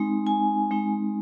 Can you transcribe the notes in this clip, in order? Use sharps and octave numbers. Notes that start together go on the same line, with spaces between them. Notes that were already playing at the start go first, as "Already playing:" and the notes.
Already playing: G#3 C4 D#4
G#5
G#3 C4 D#4